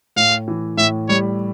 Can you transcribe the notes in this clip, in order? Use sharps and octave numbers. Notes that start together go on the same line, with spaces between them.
A2 F5
E3
A2 E5
G3 C#5